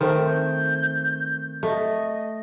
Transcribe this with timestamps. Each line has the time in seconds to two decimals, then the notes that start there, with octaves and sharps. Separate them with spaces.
0.01 D#3 A3 C4
0.27 G6
1.63 A3 D#5